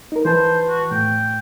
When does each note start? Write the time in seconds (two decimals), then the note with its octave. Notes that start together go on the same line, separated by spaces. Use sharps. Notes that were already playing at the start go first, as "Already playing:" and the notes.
0.12 D#4 A#4
0.25 E3 B4 C5 A5
0.69 F#4
0.91 A2 G5